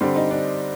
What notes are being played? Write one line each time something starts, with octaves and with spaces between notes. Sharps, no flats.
D3 G3 C4
D#4
D4